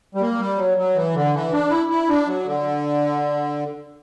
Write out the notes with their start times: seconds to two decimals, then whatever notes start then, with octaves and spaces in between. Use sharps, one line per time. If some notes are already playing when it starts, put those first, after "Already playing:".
0.15 G3
0.21 A#3
0.40 G3
0.58 F#3
0.78 F#3
0.95 E3
1.15 D3
1.34 E3
1.53 D4
1.70 E4
1.89 E4
2.08 D4
2.27 F#3
2.46 D3